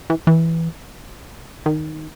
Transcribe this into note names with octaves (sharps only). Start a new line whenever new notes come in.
E3
E3
D#3